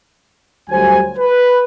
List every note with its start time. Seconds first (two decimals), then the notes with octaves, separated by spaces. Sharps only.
0.70 D2 F#3 G3 C5 G#5
1.18 B4